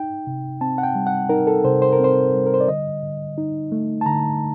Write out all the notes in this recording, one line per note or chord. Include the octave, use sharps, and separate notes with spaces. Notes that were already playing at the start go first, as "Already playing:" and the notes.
Already playing: D#4 G5
C3
C4 A5
F#5
G5
G3
F#5
D#4 A#4
A4
C3 C5
C5
A#4
C4 C5
G3
A#4
C5
D5
D3 D#5
D3
D#4
A3
A5
D3 A#5